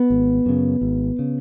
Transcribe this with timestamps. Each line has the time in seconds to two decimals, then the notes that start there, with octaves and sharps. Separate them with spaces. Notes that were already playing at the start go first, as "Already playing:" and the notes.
Already playing: B3
0.10 G#1
0.46 F#2 C#3
0.81 G#1
1.19 C#3